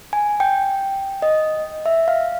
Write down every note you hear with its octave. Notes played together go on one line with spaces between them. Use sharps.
G#5
G5
D#5
E5
F5